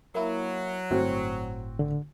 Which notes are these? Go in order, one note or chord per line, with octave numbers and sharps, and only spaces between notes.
F#3 A#3 E4
G1 A2 C4 F#4
D3